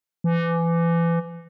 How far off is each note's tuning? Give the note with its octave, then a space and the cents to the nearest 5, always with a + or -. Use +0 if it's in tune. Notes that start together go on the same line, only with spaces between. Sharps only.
E3 +30